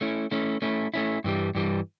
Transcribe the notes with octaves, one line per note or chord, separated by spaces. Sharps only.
A3 C#4 E4
A3 C#4 E4
A3 C#4 E4
A3 C#4 E4
G2 E3 G3
G2 E3 G3